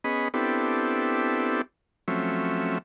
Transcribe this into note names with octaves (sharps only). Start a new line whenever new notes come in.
B3 C#4 G#4 D#5 B5
B3 C4 D4 E4 G4 A4
F3 F#3 A3 C4 C#4 E5